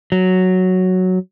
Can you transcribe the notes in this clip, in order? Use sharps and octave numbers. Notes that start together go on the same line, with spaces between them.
F#3